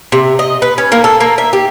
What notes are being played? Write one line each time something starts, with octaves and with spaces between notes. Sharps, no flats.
C3
D#5
B4
C#4
A#3
A4
A#3
E5
G4